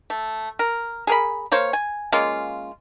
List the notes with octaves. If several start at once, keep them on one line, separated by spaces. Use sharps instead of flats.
A3
A#4
G#4 A#4 B5
A#3 C5 C#5 F5
G#5
G#3 A#3 C#4 F4